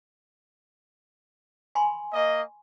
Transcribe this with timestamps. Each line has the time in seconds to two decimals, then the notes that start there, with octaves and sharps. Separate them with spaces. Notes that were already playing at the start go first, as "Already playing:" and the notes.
1.75 G#5 B5 C6
2.13 A#3 D#5